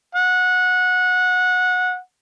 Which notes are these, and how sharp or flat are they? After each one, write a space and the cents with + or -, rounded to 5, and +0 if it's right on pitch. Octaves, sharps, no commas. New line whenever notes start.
F#5 -20